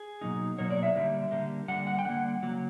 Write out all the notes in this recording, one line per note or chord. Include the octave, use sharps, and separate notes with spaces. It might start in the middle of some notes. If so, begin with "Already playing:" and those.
Already playing: G#4
B2 F#3 A#3 D#4
B2 F#3 A#3 D#4 C#5
D5
E5
D3 G3 A#3
D3 G3 A#3
D3 G3 A#3 F#5
F#5
G5
D3 G3 A#3 F#5
C#3 F#3 A#3